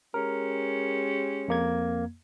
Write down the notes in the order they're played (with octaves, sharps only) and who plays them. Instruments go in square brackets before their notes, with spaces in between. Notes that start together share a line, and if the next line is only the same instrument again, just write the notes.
[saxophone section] G#3 C#4 G4 [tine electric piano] A#4
[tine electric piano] F2 A#3 G#6